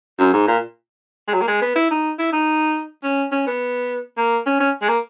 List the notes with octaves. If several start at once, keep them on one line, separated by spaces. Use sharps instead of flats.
F#2
G#2
A#2
G#3
F#3
A#3
G#3
B3
E4
D#4
E4
D#4
C#4
C#4
B3
A#3
C#4
C#4
G#3
A#3